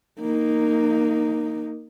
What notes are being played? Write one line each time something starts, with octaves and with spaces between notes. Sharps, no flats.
A#3 D#4